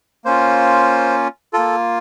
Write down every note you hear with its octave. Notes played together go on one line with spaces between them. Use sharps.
A#3 C#4 F4 C5
A#3 F4 A4